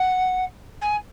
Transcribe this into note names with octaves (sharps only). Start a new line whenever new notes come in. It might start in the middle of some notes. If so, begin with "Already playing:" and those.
Already playing: F#5
G#5